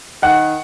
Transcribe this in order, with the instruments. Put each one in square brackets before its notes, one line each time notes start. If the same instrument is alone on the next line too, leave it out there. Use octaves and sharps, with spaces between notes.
[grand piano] D#3 F#5